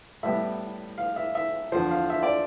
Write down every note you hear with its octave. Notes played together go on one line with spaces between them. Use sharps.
A2 G3 B3 E5
F5
E5
E5
E2 D3 F3 C5
F5
E5
D5